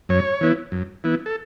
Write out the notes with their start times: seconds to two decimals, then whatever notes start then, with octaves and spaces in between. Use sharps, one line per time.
0.09 F#2 C#5
0.41 E3 B3 E4
0.72 F#2
1.04 E3 B3 E4
1.26 A4